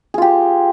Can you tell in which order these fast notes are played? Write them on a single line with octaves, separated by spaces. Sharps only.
G#4 F4 G4